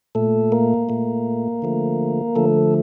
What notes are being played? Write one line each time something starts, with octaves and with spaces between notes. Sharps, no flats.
A#2 A3 A4
A#3 A#4
A#2 A3
D3 F3 A3
D3 F3 A3 A4